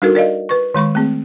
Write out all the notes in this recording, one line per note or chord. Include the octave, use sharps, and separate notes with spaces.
G3 D4 D#4 F#4 A4 A#4
A#4 D5 D#5 F5
B4 C#6
D#3 G#3 B5 C#6
A3 C4 G#4